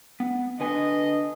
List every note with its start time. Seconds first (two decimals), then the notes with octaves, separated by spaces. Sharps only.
0.20 B3
0.60 D3 B4 D#5 G#5